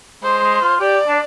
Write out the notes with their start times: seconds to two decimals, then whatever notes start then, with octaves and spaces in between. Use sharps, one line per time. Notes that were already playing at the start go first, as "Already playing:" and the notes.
0.23 G#3 C5
0.43 G#3
0.62 F4
0.80 G4 D5
1.08 D4